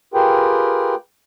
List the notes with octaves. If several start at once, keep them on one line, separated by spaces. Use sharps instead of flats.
F4 G4 G#4 A#4 B4 G5